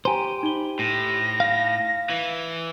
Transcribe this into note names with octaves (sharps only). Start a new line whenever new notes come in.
G4 C5 G#5 A#5 D#7
D#4 B5 G7
A2 A#6
F5
E3